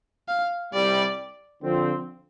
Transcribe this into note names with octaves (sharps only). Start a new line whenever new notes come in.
F5
C2 C3 G3 D5
D3 F3 C4 F4